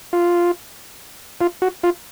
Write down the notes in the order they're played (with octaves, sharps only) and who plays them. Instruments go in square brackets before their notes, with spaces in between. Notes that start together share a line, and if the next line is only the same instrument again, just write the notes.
[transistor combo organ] F4
F4
F#4
F4